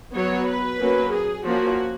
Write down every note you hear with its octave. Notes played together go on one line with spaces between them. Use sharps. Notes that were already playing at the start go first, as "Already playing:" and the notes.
F#3 B3 C#5
B4
F#3 A#3 C#4
G#4
F3 A#3 C#4 F#4